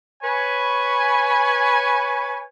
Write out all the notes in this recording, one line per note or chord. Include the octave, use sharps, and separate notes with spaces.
B4 C#5 G#5